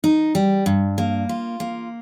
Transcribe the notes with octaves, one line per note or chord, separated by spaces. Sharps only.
D#4
G3
G2
A#3
F4
A#3